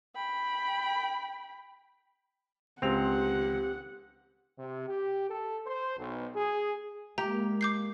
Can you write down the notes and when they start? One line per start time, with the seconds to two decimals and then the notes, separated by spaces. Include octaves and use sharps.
0.16 G5 B5
2.82 C#2 C4 G4 F#5 F7
4.58 C3
4.88 G4
5.30 A4
5.66 C5
5.97 B1
6.35 G#4
7.18 G#3 A#3 G4 A#5
7.61 D6 G6 C7